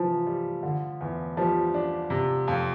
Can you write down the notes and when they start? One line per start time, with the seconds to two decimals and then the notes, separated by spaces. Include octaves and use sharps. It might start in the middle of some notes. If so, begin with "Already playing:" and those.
Already playing: C3 E3 F3
0.27 G3
0.63 D3
1.01 E2
1.37 F3 G3
1.74 D4
2.10 C3
2.48 F2